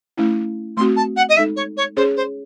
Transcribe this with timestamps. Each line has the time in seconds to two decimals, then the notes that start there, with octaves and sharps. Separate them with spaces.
0.17 A3 C#4 E4
0.77 A3 C4 F#4 C6
0.96 A5
1.16 F#5
1.29 D#5
1.37 G#3 D#4 A4 E5
1.56 C#5
1.77 C#5
1.97 C#4 G#4 C5 C#5
2.16 C5